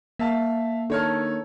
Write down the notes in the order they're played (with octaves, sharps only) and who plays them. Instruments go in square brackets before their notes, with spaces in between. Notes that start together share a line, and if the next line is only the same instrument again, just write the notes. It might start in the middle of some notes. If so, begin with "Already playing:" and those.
[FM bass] A#3 [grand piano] E5 F5 A5
[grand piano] D#3 C#5 F6 [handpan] D4 A4